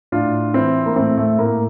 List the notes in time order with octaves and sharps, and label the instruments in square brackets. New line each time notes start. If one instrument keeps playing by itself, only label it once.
[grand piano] A2 D4 F4
E3 C4 E4
A#3
A2 A3 C4
A3
A2 A#3